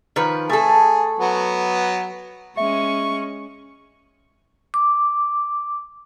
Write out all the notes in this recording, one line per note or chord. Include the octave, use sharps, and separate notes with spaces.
D#3 F3 B4
A3 G#4 A4
F#3 B3
G#3 C#4 E5 C#6
D6